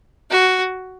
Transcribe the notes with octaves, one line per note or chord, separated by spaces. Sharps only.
F#4